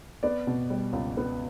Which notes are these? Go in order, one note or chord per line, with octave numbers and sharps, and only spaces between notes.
B3 D5
B2
G3
C#2
B3